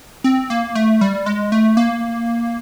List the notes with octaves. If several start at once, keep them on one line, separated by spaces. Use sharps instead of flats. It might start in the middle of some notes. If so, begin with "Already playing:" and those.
C4
A#3
A3
G3
G#3
A3
A#3